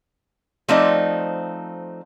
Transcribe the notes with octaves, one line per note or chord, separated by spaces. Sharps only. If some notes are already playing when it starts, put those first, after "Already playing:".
F3 A3 C4 D#4 D5